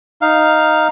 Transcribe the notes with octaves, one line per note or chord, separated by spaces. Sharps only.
D#4 F5